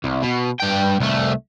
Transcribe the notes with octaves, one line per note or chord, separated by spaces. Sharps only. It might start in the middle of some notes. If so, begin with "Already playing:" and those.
C2
B2
G2 G5
C2 A3